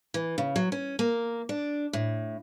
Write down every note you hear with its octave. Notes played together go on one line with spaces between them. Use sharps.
E3
C#3
F#3
C#4
A#3
D4
A2